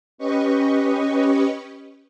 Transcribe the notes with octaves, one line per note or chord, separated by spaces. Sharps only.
C#4 G4 B4 D#5 C#6